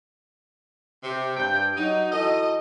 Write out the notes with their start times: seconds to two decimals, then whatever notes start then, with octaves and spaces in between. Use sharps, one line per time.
1.04 C3
1.37 G2 G5
1.76 F#3 D#4
2.11 E3 F#4 A4 D#5